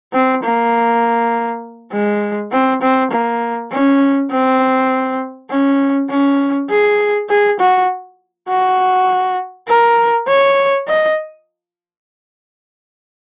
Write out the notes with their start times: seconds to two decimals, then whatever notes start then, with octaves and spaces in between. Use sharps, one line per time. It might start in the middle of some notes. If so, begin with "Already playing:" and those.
0.13 C4
0.43 A#3
1.92 G#3
2.52 C4
2.82 C4
3.11 A#3
3.71 C#4
4.31 C4
5.50 C#4
6.10 C#4
6.70 G#4
7.29 G#4
7.60 F#4
8.49 F#4
9.68 A#4
10.28 C#5
10.88 D#5